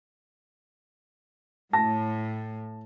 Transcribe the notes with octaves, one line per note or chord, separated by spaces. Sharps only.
A2 A5 A#6